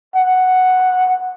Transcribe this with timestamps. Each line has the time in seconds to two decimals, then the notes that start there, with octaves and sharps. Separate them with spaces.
0.16 F#5